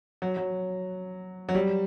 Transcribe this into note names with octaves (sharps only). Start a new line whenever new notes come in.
F#3
F#3
F#3
G3